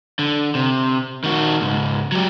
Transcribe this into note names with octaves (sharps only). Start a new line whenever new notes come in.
D3
C3
D#3 F#4
C#2 G#2
F#3 G4